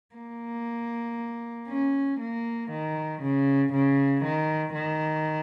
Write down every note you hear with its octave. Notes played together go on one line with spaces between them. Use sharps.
A#3
C#4
A#3
D#3
C#3
C#3
D#3
D#3